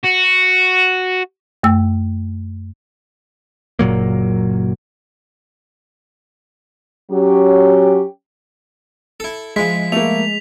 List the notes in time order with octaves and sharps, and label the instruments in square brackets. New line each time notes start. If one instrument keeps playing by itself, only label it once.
[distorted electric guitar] F#4
[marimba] F#2 A3 E6
[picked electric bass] F#1 A#2 F#3 A#3
[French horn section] F#3 C#4 G4
[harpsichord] E4 A4
[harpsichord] F3 E4 [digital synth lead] G#3 [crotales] B6
[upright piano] A3 A#3 [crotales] F7